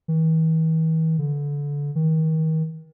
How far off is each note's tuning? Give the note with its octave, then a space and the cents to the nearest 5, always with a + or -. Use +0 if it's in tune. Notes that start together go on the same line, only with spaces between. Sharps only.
E3 -45
D3 -25
D#3 +35